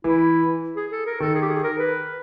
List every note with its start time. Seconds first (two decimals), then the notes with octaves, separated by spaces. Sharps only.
0.04 E3 E4
0.76 G#4
0.92 A4
1.06 A#4
1.20 D#3 A4
1.35 G#4
1.41 G4
1.49 G#4
1.63 A#4
1.78 B4